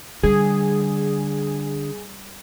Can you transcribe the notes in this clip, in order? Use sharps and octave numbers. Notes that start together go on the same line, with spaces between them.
D3 G3 G#4